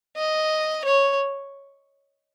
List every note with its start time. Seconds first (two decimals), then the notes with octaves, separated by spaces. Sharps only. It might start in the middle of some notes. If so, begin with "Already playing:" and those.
0.17 D#5
0.85 C#5